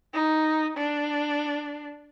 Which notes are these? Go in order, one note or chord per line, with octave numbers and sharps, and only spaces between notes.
D#4
D4